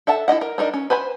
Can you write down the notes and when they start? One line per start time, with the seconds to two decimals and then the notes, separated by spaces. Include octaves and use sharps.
0.07 A4 E5 F#5 A5
0.28 E4 F4 D#5 F#5
0.41 A#4
0.58 D4 D#4 A#4 D#5
0.73 C#4
0.90 B4 C5 G#5 B5